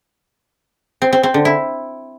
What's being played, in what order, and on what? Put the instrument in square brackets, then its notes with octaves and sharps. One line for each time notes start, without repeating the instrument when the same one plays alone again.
[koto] C4
C4
C4
D3
E4